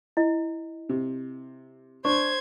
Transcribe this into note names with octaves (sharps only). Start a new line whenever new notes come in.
E4 D#5
C3
D4 C5 C#6 G#6